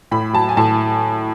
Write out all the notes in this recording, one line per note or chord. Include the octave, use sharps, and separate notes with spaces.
A2 B5
F#3 A5
G#5
A2 A5